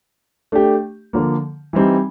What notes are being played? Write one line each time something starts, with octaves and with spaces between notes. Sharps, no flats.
A3 D4 G4
D3 F3 A#3
E3 G3 C4 D#4